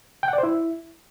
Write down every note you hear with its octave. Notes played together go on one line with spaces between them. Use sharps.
G5
F#5
D5
C5
E4